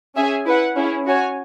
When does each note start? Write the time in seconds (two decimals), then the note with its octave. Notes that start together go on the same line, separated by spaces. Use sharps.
0.15 C#4 G#4 E5 G#5
0.45 E4 B4 F#5
0.75 C#4 E4 G#4
1.05 C#4 F#4 C#5 G#5